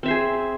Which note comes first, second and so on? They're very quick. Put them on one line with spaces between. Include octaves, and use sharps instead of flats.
C4 E5 C5 G#4